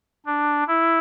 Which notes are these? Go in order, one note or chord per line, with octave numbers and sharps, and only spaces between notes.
D4
E4